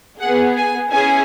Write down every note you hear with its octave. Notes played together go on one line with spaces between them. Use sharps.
B3 G#4 F#5
G#5
C#4 E4 G#4 G#5